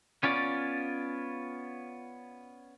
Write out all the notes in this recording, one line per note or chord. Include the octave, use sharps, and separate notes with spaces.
B3 C#4 F4 D5